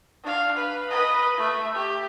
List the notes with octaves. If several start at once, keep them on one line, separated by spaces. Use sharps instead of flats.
D4 F5
B4
B4 D#5
A3 E5
G4